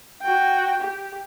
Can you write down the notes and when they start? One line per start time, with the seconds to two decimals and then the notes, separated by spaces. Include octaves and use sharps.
0.22 F#4 G5
0.80 G4